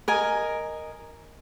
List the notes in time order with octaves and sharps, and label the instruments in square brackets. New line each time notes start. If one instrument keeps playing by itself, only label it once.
[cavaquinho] A#4 D#5 G#5